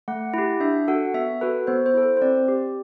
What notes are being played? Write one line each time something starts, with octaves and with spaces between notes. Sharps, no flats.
A3 F#5
E4 G4
D4 E5
F#4 A4 F#5
B3 E5
F#4 A4 B4
B3 C5
C5
E4 A4
C5
C5
C4 D5
G4